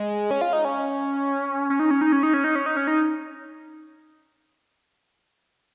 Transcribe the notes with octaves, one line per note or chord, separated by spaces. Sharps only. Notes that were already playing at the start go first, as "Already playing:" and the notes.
Already playing: G#3
C#4
F4
D#4
C#4
C#4
D#4
C#4
D#4
C#4
D#4
C#4
D#4
C#4
D#4
C#4
D#4